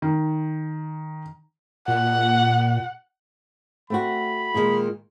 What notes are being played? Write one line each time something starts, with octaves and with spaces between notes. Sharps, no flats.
D#3
A#2 F#5
A3 C4 F#4 B5
A#2 D#3 G#3